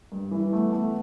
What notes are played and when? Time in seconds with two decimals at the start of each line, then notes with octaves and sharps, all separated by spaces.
0.12 G2
0.31 E3
0.52 A3 B3
0.73 A3